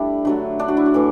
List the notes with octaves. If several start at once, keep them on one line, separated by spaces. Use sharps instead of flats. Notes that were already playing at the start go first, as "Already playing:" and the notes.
Already playing: G3 A3 D4 E4
D3 F#3 A3
D4
F#4
E4
F#4
A2 E3